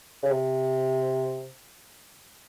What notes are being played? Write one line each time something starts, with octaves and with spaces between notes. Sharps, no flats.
C#3
C3